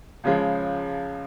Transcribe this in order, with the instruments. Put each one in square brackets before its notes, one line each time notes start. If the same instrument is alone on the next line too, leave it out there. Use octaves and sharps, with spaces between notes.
[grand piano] C#2 C#3 F3 G#3